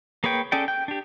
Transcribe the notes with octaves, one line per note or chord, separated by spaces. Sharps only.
A#3 G#4 B4 C#5 G5
C#4 G#4 A4 D5 G5
G5
D4 G4